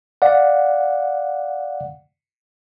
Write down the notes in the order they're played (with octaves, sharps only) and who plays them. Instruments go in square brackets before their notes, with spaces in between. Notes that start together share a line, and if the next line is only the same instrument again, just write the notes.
[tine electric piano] D5 F5 F#5